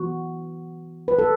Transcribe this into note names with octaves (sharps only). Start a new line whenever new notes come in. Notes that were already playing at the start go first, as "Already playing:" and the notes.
Already playing: E3 B3 F#4
B4
A4